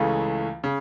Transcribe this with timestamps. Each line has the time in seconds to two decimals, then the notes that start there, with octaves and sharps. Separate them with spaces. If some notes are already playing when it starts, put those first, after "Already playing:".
Already playing: C#2 C#3 E3 A3
0.64 C#3